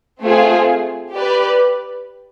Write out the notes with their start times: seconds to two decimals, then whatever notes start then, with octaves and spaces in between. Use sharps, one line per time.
0.22 A3 C4 F4 G#4
1.13 G4 B4 D5